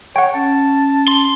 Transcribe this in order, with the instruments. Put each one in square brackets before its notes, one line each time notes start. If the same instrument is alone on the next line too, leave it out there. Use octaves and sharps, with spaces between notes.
[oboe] C#5 [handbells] F#5 G5
[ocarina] C#4 [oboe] A5
[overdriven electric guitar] C6